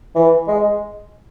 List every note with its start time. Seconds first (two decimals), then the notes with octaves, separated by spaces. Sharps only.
0.15 E3
0.48 G#3